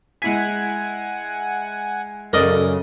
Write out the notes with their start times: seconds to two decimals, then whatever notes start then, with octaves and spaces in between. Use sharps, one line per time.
0.22 G#3 E4 F#5 G#5 B6
2.33 F#2 C#3 A4 A#4 D5 D#5